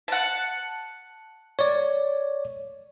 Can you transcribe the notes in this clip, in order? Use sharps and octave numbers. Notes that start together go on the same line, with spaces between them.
F#5 A5
C#5 D5